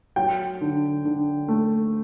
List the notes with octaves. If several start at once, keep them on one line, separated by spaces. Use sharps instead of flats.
F#3 G5
D3
D3
A3